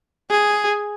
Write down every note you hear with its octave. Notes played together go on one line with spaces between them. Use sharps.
G#4